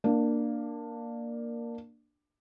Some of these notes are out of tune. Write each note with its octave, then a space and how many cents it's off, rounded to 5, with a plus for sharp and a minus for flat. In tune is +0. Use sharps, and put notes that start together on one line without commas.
A#3 +0 D4 +15